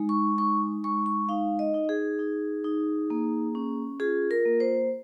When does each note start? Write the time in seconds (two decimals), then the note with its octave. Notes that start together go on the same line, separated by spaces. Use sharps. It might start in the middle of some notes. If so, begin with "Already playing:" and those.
Already playing: G#3 D#4
0.09 C#6
0.38 D#4 C#6
0.84 G#3 C#6
1.06 C#6
1.29 D#4 F5
1.59 D#5
1.74 D#4
1.89 G#4
2.19 D#4
2.64 D#4
3.10 A#3
3.55 C#4
4.00 F4 G#4
4.31 A#4
4.46 A#3
4.60 C5